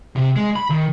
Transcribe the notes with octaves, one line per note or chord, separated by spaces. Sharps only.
C3
G#3
B5
D#3